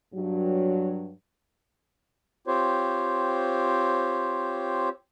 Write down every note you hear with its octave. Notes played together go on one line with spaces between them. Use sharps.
G2 F#3
C4 F4 G4 C5 C#5